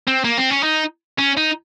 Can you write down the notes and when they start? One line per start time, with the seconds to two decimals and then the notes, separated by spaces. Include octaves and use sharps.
0.08 C4
0.25 A#3
0.38 C4
0.51 C#4
0.63 D#4
1.18 C#4
1.37 D#4